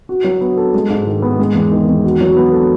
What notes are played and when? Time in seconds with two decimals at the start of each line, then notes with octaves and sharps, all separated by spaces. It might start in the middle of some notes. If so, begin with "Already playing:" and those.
0.09 F#4
0.24 F#3
0.41 B3
0.57 A4
0.74 G#3
0.90 G#2
1.07 D#3
1.22 B3
1.39 G#3
1.55 E2
1.71 D#3
1.88 E2
2.04 F#4
2.21 F#3
2.37 B3
2.52 A4